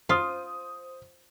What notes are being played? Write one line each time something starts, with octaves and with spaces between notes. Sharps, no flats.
F4 C5 D#6